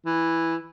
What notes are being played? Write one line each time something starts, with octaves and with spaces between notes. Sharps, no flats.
E3